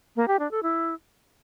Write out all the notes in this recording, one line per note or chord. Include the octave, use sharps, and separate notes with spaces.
A#3
G4
D4
A4
E4